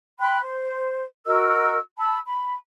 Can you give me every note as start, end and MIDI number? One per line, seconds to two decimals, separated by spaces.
0.19 0.39 79
0.19 0.39 83
0.19 0.39 84
0.19 0.39 90
0.40 1.04 72
1.26 1.77 66
1.26 1.77 70
1.26 1.77 75
1.26 1.77 88
1.98 2.18 81
1.98 2.18 83
1.98 2.18 88
2.26 2.55 83